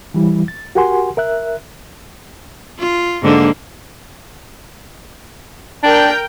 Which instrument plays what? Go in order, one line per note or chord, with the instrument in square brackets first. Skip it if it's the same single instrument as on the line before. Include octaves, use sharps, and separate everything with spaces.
[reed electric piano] E3 G3 E4
A6
F#4 G4 A#4 F#5 G#5 C6
A#4 E5 F#6
[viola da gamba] F4
G#2 D3 A#3
[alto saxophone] D4 [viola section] A#4 G5